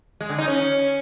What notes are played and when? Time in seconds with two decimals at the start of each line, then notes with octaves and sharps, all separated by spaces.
0.21 G#3
0.30 D3
0.38 D#4
0.47 C#4